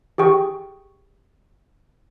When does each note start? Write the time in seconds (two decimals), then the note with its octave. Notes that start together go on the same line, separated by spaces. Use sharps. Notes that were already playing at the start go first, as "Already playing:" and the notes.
0.18 G4 G#4 G5 C#6